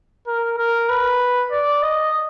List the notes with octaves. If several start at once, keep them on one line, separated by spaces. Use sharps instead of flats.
A#4
A#4
B4
D5
D#5